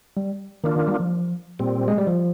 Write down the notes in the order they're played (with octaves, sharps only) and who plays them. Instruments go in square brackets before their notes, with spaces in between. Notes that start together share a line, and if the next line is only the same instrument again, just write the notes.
[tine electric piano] G3
[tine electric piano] D#3 [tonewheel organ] A#3 D4 F4
[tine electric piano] D#3
G3
F3
[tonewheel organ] A#2 G3 C4
[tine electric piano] G#3
G3
F3